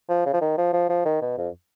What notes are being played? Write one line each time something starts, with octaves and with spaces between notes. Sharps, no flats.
F3
C#3
F3
D#3
F3
F3
F3
D#3
B2
F2